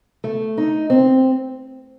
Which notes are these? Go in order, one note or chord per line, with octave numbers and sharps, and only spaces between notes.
A3
D#4
C4